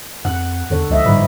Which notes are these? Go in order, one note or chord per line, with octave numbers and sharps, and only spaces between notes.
F2 F#5 F#6
E2 D3 A4 C#5
C#2 F3 D#5 E5
G1 G#2 B4